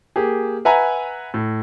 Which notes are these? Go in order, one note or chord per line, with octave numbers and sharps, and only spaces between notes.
A#3 G4 G#4
B4 E5 F#5 G#5 A#5
A2